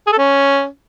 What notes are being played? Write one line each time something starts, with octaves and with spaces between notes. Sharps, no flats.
G#4
A4
C#4